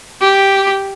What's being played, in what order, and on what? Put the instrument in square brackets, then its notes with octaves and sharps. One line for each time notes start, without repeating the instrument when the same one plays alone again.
[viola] G4